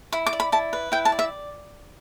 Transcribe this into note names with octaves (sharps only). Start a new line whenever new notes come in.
E4 B5
D6
D5
B5
E4 A5
B4
E4 G5
A5
D5
E5